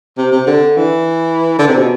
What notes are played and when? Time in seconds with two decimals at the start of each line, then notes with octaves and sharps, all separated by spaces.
0.18 C3
0.32 C3
0.47 D3
0.77 E3
1.59 D3
1.68 C3
1.78 B2